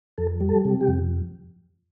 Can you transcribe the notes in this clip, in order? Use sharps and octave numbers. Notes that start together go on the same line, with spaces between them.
F2 A4
G3
A4
C3
G4
F2